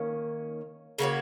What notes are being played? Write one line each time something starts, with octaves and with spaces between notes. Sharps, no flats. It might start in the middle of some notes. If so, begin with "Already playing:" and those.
Already playing: D#3 A#3 C#4
C#3 A#3 F#4 C#5